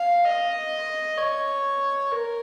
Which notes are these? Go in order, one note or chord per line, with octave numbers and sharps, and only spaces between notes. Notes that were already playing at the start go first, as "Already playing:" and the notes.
Already playing: F5
D#5
C#5
A#4